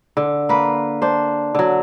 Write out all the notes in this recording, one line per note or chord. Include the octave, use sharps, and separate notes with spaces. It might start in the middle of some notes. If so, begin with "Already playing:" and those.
D3
A#3 B4
D4 C5
D3 F#3